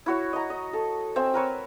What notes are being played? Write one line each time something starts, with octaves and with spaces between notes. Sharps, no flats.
E4 F#4 C#5
D#5 A#5
D#5
A4
C4 E5 G#5
A#4 B4 C#5